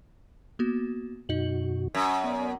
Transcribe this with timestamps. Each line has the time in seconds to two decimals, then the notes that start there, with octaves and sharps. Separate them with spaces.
0.59 A#3 B3 F#4
1.29 F#2 B2 D#4 F#4 D#5 F#7
1.95 F#2 B6
2.24 B3 D5